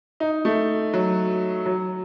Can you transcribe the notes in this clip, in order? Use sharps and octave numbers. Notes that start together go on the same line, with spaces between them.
D#4
A3
F#3
F#3